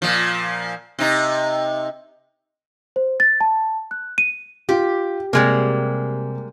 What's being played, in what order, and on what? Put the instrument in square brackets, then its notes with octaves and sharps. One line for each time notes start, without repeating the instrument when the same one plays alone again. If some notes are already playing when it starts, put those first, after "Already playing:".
[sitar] A#2 F3
C3 D#4
[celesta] C5
A6
A5
F#6
D#7
[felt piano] F4 [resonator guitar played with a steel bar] G4
[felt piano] C3 [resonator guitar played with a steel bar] G3 G#3 A#3